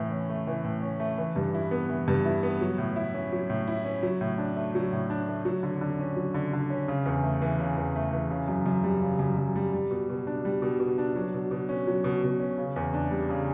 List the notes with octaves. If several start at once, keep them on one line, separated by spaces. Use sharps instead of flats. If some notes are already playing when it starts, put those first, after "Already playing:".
Already playing: A2 E3
C#4
A3
E3
A2
C#4
A3
E3
G2
E4
B3
E3
G2
E4
B3
F#3
A2
E4
C#4
F#3
A2
E4
C#4
F#3
A2
D4
A3
F#3
A2
D4
A3
F#3
D3
D3
C#4
F#3
D3
D3
C#4
C#3
E2
A3
E3
C#3
E2
A3
E3
C#3
F#2
F#2
G3
C#3
F#2
F#2
G3
G3
B2
B2
D4
G3
B2
B2
D4
F#3
B2
B2
C#4
F#3
B2
B2
C#4
C#3
E2
D4
G3
C#3